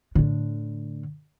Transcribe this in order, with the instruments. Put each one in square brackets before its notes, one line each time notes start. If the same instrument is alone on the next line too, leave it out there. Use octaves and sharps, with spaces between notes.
[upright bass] A2 D3